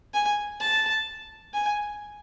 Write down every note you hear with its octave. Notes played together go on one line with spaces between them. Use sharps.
G#5
A5
G#5